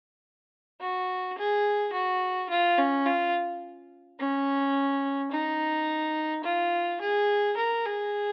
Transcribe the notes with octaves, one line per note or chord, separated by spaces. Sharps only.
F#4
G#4
F#4
F4
C#4
F4
C#4
D#4
F4
G#4
A#4
G#4